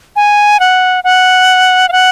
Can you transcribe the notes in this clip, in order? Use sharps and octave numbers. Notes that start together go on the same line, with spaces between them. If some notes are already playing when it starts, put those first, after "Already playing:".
G#5
F#5
F#5
F5
F#5